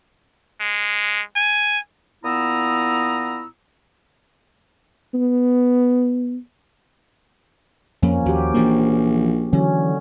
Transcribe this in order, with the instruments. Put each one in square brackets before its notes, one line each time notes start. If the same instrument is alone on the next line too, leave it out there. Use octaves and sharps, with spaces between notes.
[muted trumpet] G#3
G#5
[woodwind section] A#2 B3 E4 A#5 D#6 E6
[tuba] B3
[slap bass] F2 [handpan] F3 A#3 C#4
[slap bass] D#2 [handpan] F#4 G4
[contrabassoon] A#1 [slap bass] E3 F3 A#3
[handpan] D3 F#3 C#4 [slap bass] E3